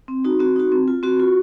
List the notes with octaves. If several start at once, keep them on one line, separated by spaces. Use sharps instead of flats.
C4
D#4 F#4
C4 F#4
D#4 F#4
C4
F4
C4 F#4
F4